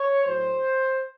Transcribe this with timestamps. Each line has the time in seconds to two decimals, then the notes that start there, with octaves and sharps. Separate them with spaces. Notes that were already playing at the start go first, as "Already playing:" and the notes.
Already playing: C#5
0.24 A2 F#3 C5